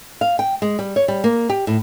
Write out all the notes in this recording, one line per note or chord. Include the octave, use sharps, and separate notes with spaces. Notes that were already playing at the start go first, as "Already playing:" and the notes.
F5
G5
G#3
G3
C#5
G3
A#3
G4
A2